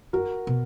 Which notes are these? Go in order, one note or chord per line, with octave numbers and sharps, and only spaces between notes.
F#2 F#4 A#4
B2